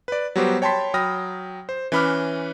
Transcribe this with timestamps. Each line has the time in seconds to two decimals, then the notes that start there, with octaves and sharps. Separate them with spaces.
0.08 B4 D5
0.36 F#3 G3 B3 F#4 G4 C5
0.62 C#5 G5 A5 B5 C6 B6
0.94 F#3 G5 B5 D#6 F6 A#6
1.69 C5
1.92 E3 C#4 B4 B5 D6 F6